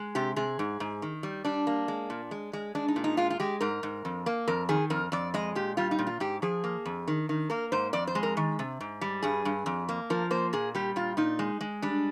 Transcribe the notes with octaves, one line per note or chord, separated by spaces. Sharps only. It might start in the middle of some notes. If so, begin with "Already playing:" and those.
Already playing: G#3
C3 G4
C3 G#4
G#2
G#2
D#3
G3
G3 D4
A#3
G#3
A#2
G#3
G#3
G#3 D4
D#4
A#2
D#4
G#3 F4
F4
G#3 G4
G#2 A#4
G#2
F2
A#3
F2 A#4
D#3 G#4
F2 A#4
F2 D5
G#3 D#5
A#2 G4
G3 F4
D#4
A#2
F4
G#2 G4
F3 G#4
A#3
F2
D#3
D#3
A#3 A#4
G#2 C5
F2 D5
C5
G#3
A#4
D#3
C3
G#2
G3
G2 G#4
G2
F2
A#3
F3 A#4
A#3 C5
A#2 G#4
G3 G4
A#2 F4
A#2 D#4
G#3
G#3
G3 D4